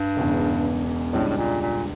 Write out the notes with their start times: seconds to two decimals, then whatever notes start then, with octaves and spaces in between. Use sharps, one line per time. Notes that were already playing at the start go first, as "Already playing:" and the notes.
Already playing: G2
0.16 E1 E2 C#3
1.12 C#2 A2 C#3 G3 D4
1.29 A2
1.37 A#2
1.61 A#2